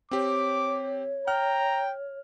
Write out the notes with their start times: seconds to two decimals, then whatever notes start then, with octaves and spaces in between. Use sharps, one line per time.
0.11 C4 G4 C#5 D6
1.28 G5 A#5 F6